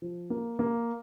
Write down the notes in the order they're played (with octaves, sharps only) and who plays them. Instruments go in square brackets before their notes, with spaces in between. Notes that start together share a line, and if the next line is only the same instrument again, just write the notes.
[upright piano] F3
A#3
A#3